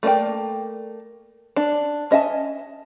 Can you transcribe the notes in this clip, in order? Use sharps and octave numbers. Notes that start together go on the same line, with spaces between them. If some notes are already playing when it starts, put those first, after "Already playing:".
A3 A#3 D5 G5
D4
C#4 D#5 E5 G#5 A5